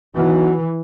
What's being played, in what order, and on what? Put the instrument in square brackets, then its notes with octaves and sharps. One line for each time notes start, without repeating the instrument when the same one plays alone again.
[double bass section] E3 [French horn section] F#3 B3 D#4 F#4